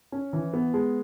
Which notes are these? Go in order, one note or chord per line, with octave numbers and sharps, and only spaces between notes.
C#4
E3
B3
G#3